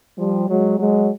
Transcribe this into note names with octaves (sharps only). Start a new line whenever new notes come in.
F3 G3
F#3 G#3
F#3 G#3